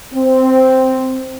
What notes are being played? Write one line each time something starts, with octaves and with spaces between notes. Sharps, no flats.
C4